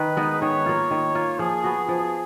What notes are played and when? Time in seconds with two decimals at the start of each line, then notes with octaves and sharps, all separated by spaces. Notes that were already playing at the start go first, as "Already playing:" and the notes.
Already playing: D#3 B4
0.17 G#3 B3 D#4
0.41 D#3 C#5
0.66 A#3 F4
0.91 D#3
1.15 A#3 F4
1.39 F3 G#4
1.64 B3 F#4
1.88 F3